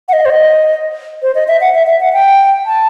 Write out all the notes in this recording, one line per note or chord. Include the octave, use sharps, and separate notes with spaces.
F#5
D#5
C5
D#5
C5
D#5
E5
F#5
E5
E5
F#5
G5
A5